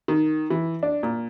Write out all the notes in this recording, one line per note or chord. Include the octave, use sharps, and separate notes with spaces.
D#3
E3
D4
A#2